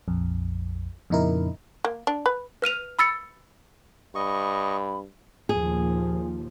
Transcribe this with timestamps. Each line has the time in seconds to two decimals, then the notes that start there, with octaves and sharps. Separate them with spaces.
0.08 A#1 F2
1.10 F2 A#2 C#3 D#4 E4 A#4
1.85 A#3
2.07 D4
2.26 B4
2.62 B4 F6 D#7 F7
2.99 B5 E6 A6 C#7
4.15 G2 D#5 B5 C#6
5.49 D#2 A#2 F3 G#4